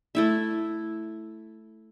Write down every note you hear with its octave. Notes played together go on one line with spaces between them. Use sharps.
A3 E4 E5